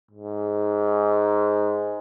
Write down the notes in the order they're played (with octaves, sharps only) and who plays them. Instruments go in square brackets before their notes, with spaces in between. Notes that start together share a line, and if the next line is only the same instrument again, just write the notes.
[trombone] G#2